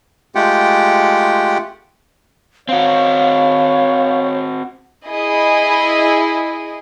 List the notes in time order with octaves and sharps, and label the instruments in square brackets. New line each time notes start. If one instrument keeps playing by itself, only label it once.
[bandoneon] G#3 A3 F4 G4 F#5 G5
[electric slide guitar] C4 F#4 [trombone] C#5 [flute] F5
[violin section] E4 G#4 D#5